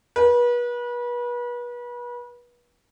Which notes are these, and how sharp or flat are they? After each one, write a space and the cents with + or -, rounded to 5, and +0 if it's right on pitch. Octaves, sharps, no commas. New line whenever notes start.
B4 -35